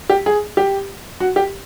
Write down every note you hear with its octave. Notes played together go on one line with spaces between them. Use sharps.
G4
G#4
G4
F#4
G4